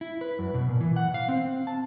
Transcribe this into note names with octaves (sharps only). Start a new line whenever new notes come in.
E4
B4
F#2
B2
A#2
E3
F#5
F5
C4
A5